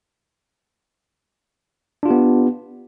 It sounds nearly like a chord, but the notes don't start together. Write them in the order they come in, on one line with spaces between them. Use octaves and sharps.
D4 F4 G4 B3